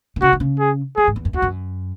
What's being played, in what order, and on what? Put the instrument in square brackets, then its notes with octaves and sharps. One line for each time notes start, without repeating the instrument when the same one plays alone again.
[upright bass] D#3
[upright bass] C#3 [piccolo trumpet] F#4
[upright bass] D#3
C#3
[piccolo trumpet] G#4
[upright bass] E3 [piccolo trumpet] G#4
[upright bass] G#2
E2
F#2
[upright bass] E2 [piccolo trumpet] F#4
[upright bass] F#2